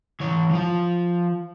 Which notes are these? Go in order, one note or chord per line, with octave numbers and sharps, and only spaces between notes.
E3 C#5
F3 F4